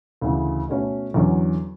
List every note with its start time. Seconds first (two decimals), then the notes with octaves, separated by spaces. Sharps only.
0.21 D2 C#3 E3
0.69 B2 A3 C#4 F#4
1.14 E2 D3 F#3 C#4